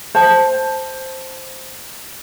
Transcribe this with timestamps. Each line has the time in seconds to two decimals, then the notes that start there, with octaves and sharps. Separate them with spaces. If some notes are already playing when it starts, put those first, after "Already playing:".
0.15 C5 A5